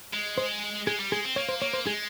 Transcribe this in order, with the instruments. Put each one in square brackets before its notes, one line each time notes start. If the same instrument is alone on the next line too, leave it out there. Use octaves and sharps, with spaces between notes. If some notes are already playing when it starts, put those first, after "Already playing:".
[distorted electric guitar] G#3
[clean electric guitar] C5
[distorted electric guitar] G#3 [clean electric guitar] G#4
[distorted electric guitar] G3
[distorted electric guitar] G#3 [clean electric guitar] G#4
[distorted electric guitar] C4
[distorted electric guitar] A#3 [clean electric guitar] C#5
[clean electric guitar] C5
[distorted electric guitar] A#3 [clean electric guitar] C#5
[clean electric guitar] C5
[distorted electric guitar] G#3 [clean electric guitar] G#4